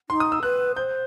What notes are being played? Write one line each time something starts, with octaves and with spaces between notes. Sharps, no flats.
D#4 C6
D#6
E6
B4 F#6
C5 G6